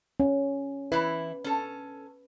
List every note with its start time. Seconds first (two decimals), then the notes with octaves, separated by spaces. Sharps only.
0.20 C#4
0.92 E3 E4 B4
1.44 C#4 A4